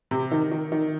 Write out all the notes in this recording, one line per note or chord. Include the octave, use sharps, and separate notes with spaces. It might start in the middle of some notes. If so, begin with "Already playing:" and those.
C3
D#3
D#3
D#3